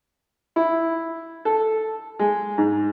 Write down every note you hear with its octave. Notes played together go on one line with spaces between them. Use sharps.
E4
A4
G#3
G#2